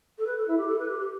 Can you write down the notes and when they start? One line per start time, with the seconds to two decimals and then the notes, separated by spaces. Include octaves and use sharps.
0.18 A4
0.27 B4
0.37 A4
0.48 E4
0.58 G4
0.68 A4
0.79 B4
0.89 G4
1.00 G4